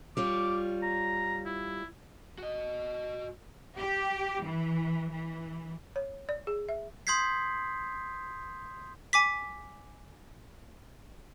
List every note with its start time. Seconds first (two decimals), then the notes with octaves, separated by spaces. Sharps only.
0.17 G3 F4 C#5 D6
0.83 A#5
1.45 E4
2.38 F#4 D#5
3.79 G4
4.44 E3
5.12 E3
5.96 C#5
6.29 D5
6.47 G#4
6.69 E5
7.07 C6 D#6 G6 G#6 B6 C7
9.13 G#5 D6 B6